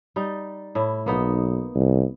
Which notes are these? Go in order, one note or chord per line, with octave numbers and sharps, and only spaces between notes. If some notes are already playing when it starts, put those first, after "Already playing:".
G3 D#4
A2 E4
B1 A#3 B3 D#4
C2